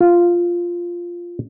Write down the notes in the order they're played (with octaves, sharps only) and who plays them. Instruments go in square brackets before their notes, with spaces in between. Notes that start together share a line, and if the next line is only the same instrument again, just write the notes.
[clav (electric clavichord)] F4